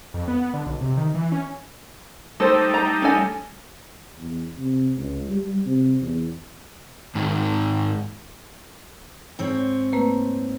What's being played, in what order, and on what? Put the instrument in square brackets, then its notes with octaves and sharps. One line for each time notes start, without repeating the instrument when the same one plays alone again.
[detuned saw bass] F2
B3
B3
D3
B1
C3
D#3
E3
C#4
[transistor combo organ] G3 A3 D#4 [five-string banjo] A4 C5
[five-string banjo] A#5
C#4 A4 G#5
[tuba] E2
C3
C#2
G3
C3
E2
[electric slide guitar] G#2 D#3
[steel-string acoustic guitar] G#2 C4 C#5
[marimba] A3 A#3 B4